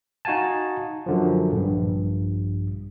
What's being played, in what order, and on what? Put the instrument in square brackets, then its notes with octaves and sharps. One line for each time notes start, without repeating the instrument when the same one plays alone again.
[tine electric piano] D#4 F#4 F5 G#5 A5
F#2 D3 F3
A#1 G2